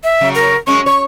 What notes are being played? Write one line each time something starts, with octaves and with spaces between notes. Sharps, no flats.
E5
C#3 F#3
A#4
F#2 G#3 C#4 C#6
C#5 C#6